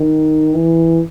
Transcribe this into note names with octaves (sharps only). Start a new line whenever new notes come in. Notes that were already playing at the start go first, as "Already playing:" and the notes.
Already playing: D#3
E3